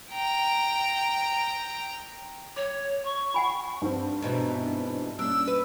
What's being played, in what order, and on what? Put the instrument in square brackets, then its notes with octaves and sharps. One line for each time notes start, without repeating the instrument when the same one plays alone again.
[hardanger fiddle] G5 A#5
[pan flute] C#5 [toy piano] D6
[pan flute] C#6
[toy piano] F#5 G#5 B5
[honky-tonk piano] G2 C4
[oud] G#2 B2 E3
[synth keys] G3 A#3 C#4 [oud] D4 [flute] E6
[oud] B4